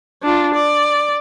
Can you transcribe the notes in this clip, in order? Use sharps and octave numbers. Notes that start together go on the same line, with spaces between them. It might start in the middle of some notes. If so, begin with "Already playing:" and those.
D4 F4
D5